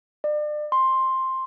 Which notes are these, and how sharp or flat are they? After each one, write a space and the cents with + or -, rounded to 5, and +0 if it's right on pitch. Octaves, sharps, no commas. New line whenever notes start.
D5 +35
C6 +10